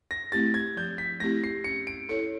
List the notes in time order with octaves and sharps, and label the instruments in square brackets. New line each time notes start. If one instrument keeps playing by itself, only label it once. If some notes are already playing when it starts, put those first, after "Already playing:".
[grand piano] A#6
[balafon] A3 C4 E4 G4 [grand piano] A6
[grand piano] G#6
[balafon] F3 [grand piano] G6
[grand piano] B6
[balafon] A3 C4 E4 G4 [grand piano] A#6
[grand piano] C7
[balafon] C#4 [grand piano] C#7
[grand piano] D7
[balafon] E4 A4 C#5 [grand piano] C#7